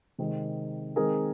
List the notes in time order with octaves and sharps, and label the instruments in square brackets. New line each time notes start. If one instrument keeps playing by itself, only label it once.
[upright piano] C3 D#3 G#3 C4
D#3 G#3 C4 G#4 A#4